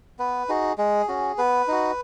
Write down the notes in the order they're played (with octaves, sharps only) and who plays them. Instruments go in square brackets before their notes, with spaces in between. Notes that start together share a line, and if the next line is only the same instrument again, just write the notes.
[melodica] B3 B4
D#4 F#4 G#4
G#3 G#4
C#4 F#4
B3 B4
D#4 F#4